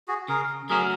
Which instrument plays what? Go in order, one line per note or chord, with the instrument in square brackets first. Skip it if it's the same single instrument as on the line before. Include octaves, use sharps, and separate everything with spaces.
[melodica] F#4 G#4
[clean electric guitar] C#3 [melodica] G#4 A#4
[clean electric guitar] F#3 A3 C#4 F#4 [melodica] G#4 A#4